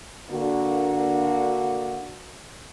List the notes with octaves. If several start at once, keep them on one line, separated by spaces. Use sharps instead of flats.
D3 A#3 F#4